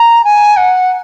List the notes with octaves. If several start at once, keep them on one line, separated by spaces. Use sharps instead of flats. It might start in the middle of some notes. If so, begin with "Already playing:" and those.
Already playing: A#5
G#5
F#5